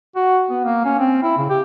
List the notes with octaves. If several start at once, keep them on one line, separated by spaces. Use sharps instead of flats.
F#4
B3
A#3
C#4
C4
E4
C#3
G4